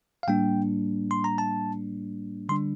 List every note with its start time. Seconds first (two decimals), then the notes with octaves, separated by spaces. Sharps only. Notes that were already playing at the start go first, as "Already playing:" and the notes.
0.23 F5
0.27 A2 G3 A#3 D4 G5
1.11 C6
1.24 A#5
1.38 A5
2.49 D3 G3 D4 C6